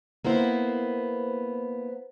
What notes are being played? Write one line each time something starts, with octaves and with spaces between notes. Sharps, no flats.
A#3 B3 E4 C5